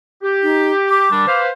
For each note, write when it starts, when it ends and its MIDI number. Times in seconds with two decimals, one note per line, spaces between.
0.23 1.06 67
0.43 0.72 63
0.90 1.40 86
1.11 1.26 51
1.11 1.26 55
1.11 1.26 62
1.27 1.49 71
1.27 1.49 72
1.27 1.49 77